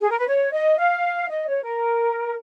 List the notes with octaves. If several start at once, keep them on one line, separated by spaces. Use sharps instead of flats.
G#4
A#4
B4
C#5
D#5
F5
D#5
C#5
A#4